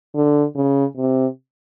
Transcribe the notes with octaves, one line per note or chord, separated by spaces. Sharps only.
D3
C#3
C3